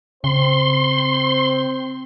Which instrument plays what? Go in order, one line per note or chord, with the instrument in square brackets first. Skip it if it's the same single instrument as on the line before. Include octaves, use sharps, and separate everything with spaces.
[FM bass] C#3 [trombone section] C4 C5 [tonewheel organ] C6